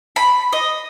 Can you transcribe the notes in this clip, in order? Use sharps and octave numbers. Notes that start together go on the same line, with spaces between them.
B5
D#5